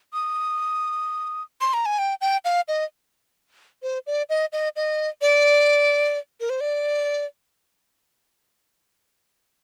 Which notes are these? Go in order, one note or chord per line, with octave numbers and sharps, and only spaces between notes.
D#6
C6
A#5
G#5
G5
G5
F5
D#5
C5
D5
D#5
D#5
D#5
D5
A#4
C5
D5